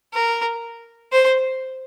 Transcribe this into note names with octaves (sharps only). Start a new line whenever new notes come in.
A#4
C5